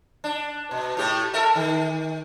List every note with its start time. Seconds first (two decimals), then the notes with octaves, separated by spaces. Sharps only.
0.24 D4
0.71 B2
0.97 A2 A3 G4
1.33 A4 A#4 E5
1.55 D#3